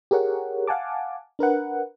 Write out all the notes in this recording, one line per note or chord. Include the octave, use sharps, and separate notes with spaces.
G4 G#4 A#4 C#5 F#5
F5 F#5 G#5 A5 D6
D4 A#4 B4 F#5